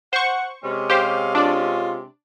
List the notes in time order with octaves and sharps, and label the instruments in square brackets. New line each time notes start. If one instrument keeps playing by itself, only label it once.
[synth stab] C5 C#6 [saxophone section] F#5
[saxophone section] C3 G#3 C#4
[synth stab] G4 C5 [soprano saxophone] F5
[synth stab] D4 D5 [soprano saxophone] F4